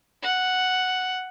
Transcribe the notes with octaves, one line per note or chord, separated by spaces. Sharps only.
F#5